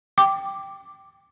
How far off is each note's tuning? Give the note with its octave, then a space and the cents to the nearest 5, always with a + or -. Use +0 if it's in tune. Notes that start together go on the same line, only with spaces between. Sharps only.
G5 +0 D6 +0